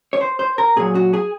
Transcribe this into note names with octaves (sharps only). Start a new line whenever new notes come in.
C#5
C5
C5
A#4
A#2 F#3 G#4
F#4
G#4